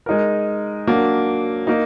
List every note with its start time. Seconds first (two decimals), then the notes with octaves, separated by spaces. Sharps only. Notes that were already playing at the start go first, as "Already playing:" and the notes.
0.06 G#3 D#4 A#4
0.87 F#3 A#3 D4
1.67 A#3 D#4